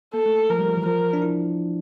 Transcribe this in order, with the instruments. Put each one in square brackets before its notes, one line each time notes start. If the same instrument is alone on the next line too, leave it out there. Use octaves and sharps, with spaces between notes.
[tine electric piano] A#3 [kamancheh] A4
[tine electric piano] A3
[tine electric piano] F3 [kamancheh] A#4
[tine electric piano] G3
F3
E3
[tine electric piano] F3 [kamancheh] A#4
[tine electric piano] D4
E4